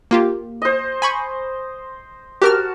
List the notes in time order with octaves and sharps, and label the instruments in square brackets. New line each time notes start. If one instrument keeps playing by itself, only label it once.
[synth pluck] A#3 F4 G4
[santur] C5 D#5
[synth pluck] G#5 B5 C#6
[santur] F#4 A5 [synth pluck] G4 A#4 F6